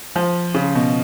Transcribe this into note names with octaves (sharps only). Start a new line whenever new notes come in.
F3
C#3
B2